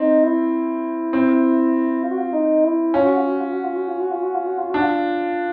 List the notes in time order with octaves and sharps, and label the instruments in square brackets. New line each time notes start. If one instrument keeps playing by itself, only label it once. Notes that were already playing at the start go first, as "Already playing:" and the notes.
Already playing: [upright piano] C4 [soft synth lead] D#4
[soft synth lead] E4
[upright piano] C4
[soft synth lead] F4
F#4
F4
D#4
E4
[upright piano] C#4 [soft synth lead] F4
[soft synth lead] F#4
F4
F#4
F4
F#4
F4
F#4
F4
F#4
F4
F#4
F4
F#4
F4
[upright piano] D4 [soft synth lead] F#4
[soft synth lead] F4